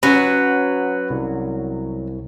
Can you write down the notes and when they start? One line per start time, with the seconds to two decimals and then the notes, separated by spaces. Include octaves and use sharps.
0.03 F#3 C#4 B4 F#5
1.10 C2